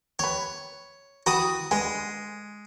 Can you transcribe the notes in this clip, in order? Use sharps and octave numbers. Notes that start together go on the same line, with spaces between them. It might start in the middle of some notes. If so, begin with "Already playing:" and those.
G4 B4 C#5
E3 F#4 F#5 G5 B5 D#6
D3 G#3 B4 G#5